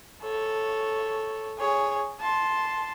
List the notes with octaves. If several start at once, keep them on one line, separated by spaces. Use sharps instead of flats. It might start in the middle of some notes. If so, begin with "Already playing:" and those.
A4 C#5
G#4 C#5
A5 C6